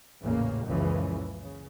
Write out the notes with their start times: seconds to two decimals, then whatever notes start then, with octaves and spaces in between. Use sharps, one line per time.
0.22 A1 E2 A#2 C#3 A#3
0.66 C#2 F#2 A#2 C#3 E3 F3
1.37 C#3